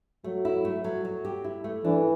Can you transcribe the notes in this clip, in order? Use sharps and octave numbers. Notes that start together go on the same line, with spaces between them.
F#3 A3
E4
A3
F#3
F#3
G4
E4
A3
E3 D4